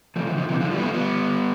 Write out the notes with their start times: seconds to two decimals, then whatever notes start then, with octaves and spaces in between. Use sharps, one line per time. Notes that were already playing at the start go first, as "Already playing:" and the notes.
0.16 F3 A3
0.27 D3 F3
0.37 D3 F3
0.49 C3 E3
0.60 D3 F3
0.71 E3 G3
0.78 B3
0.83 F3 A3
0.94 G3 B3